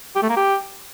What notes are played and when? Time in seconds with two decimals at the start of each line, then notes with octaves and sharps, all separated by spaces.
0.15 G4
0.22 A3
0.30 A#3
0.37 G4